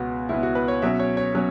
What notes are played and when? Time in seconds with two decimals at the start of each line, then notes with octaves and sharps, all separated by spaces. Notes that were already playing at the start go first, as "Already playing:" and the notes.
Already playing: C#2 B2 B3 F#4
0.29 C#2 B2 B3 E4
0.43 F#4
0.55 B4
0.68 C#5
0.82 B2 F#3 C#4 E5
1.00 C#5
1.17 C#5
1.35 B2 F#3 C#4